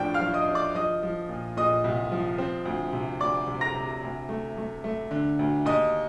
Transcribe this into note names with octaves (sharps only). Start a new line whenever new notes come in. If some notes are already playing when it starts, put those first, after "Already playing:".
Already playing: A2 F3 D4 G5 G6
F5 F6
F3
D#5 D#6
D4
D5 D6
F3 D#5 D#6
F3
A#2
A#2 D#5 D#6
C2
F3
C4
D2
C3
D2 D5 D6
C3
A#5 A#6
C3
D2
A3
A3
A3
D3
D2
D#2 D#5 D#6